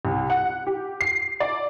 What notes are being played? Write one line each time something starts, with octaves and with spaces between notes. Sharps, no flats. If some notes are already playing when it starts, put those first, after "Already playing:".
C2
F#5
G4
C7
D5